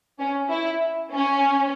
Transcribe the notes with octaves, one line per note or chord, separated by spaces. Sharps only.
C#4
E4
C#4